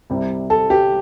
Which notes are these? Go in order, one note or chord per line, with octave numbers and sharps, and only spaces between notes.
C2 C3 G3
A4
G4